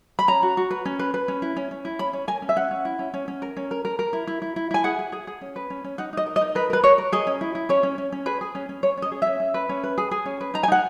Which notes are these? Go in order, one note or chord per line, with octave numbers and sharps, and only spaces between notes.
B5
C#4 A#5
F#4
F#4
B4
C#4
B4
B4
C#4
E4
C#4
C#4
E4
C#4 B5
C#4
A#4 G#5
C#4
E5
C#4 F#5
C#4
E4
C#4
C#4
C#4
A#4
C#4
A#4
A#4
A#4
E4
E4
E4
E4
E4 G#5
G#4 F#5
G#4
G#4
G#4
C#4
B4
C#4
C#4
D#4 F#5
D#4 D#5
A#4
D#5
D#4
A#4 B4
A#4 B4
A#4 C#5
A#4
G#4 D#5
C#4
E4
E4
C#4 C#5
C#4
C#4
C#4
G#4 B4
G#4
C#4
C#4
C#4 C#5
C#4 D#5
G#4
C#4 E5
C#4
B4
C#4
B4
G#4
G#4
C#4
B4
D#4 A#5
G#5
D#4 F#5